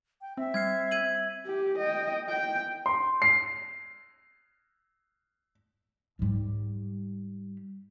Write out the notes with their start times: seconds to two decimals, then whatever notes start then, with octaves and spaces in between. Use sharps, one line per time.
0.21 G5
0.37 C4 E5
0.54 G3 F6 G#6 C7
0.91 G#6 D#7 F#7
1.46 G4
1.78 D#5 G5
2.29 G5
2.86 C6
3.22 C7
6.19 G#2 G3